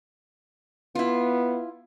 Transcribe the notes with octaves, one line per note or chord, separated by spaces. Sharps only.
B3 E4 F4